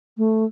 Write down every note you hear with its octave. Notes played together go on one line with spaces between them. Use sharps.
A3